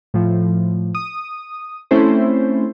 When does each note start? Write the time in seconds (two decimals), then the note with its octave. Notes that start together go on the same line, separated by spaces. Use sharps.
0.14 A2 F3
0.95 D#6
1.91 A3 C4 C#4 E4 A4 C5